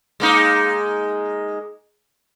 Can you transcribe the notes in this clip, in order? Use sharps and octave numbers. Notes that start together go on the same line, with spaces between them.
G#3 A#3 D#4